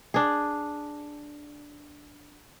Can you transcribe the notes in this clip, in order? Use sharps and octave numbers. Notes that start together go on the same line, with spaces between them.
D4 G#4